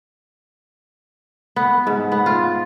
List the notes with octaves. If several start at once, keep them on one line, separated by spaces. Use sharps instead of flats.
B3
G#2
B3
F4